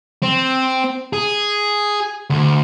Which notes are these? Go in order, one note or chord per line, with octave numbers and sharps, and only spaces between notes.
C4
G#4
D2